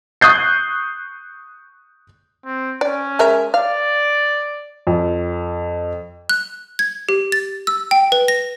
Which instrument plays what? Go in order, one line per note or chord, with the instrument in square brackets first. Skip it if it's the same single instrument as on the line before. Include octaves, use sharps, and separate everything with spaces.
[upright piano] C#6 D#6 F#6 G6 C7
[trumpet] C4
[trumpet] C#4 [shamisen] D5
[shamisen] G#3 A#4 E5
[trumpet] D5 [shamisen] F5
[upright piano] F2
[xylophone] F#6
G#6
G4
A6
E6
G5
B4
A#6